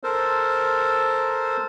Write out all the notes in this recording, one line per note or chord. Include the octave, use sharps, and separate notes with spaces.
A4 A#4 C5